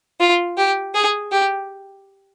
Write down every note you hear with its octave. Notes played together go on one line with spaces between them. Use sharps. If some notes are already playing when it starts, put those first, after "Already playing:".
F4
G4
G#4
G4